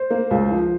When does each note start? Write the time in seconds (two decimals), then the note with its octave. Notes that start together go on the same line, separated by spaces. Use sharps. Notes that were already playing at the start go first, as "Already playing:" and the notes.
Already playing: C5
0.10 A#3
0.31 C#2
0.51 F3